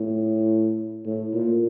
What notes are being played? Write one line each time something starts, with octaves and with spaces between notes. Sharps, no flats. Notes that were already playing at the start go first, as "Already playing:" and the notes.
Already playing: A2
A2
A#2